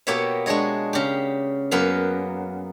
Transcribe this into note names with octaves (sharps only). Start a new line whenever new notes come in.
B2 A#3 B3 G4 C#5 E5
G#3 D4 G#4 C#5 D#5
C#3 G4
F#2 A#3 B3 B4 F5